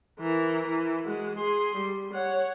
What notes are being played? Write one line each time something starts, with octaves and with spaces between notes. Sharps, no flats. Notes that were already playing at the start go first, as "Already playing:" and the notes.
E3 A#4
E3
G#3 F#4
G#4 C6
G3
C#5 F#5